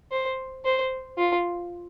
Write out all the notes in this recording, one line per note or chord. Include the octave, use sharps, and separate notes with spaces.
C5
C5
F4